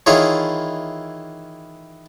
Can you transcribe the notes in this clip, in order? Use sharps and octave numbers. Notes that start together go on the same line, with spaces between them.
D#3 E3 E4 F4 G#4 C#5